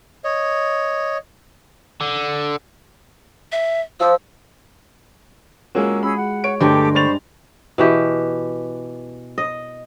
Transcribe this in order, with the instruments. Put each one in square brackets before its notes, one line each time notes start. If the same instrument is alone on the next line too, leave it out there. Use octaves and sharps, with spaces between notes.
[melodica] C#5 D#5
[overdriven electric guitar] D3
[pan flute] E5
[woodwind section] F3 [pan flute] E6
[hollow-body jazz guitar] G#3 F4 F#4 [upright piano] A#3 C#4 G#4 [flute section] E6
[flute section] C#4 G#4 E6 [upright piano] B5
[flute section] F#5
[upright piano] C#5 D7
[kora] G2 G#3 G5 [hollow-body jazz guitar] D3 A3 [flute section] G4 A4 D6
[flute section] C5 B5 C#6 [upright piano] D5 A6 F7
[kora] B2 E3 G4
D#5